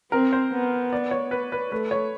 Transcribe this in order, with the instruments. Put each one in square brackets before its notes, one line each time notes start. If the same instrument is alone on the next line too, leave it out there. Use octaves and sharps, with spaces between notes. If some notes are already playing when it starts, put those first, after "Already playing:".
[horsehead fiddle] C4 [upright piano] A#4
[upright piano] C5
[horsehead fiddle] B3
[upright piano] D5
C#5
B4
B4
[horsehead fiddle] A3 [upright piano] B4
[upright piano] C#5